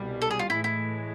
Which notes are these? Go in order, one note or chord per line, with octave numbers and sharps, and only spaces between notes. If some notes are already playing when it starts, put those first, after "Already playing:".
Already playing: C2 B2 G3
A4
G#4
F4
A2 E3 G#3 E4
E4